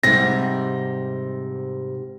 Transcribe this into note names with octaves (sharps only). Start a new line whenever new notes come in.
G#2 C3 G3 A#6